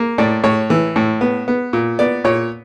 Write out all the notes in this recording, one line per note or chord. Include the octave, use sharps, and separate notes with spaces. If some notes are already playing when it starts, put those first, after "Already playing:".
Already playing: A#3
A2 D5
A2 C#5
E3
A2
B3
B3
A#2
B3 D5
A#2 C#5